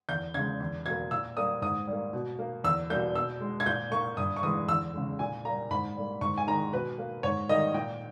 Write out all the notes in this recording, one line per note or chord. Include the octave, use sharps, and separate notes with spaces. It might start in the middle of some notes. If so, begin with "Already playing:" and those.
E2 G6
C#3 G#3 G#6
E2
B2 A#3 G#6
A#2 E6
G3 A#3 D#6
G#2 D#6
G3 A#3
B2
A#3
E2 E6
B2 G3 A#3 G6
B2 E6
G#3
G#6
A#2 G6
A#3 C#6
G2 D#6
C#6
E3 G#3 D#6
E2 E6
C#3 G#3
A#2 G#5
G3 A#3 A#5
G#2 B5
G3 A#3
G#2 C#6
G#5
D#3 G#3 A#5
B2 B4
A#3
G#2 C#5
D#3 G3 A#3 D#5
A#2 G5